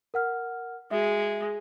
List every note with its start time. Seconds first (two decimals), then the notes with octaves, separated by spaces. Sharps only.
0.14 A#4 F#5 F6
0.91 G#3 F#4 E5